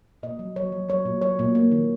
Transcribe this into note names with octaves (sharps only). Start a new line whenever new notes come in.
A#2 D#5
F#3
F#3 C#5
F#3
F#3 C#5
A#2
F#3 C#5
A#2
A#3
D#3